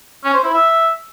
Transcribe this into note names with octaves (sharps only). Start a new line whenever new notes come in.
C#4
C5
E4
E5